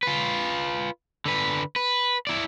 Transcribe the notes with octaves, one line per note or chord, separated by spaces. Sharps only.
F4 B4
D3 B4
B4
E4 D5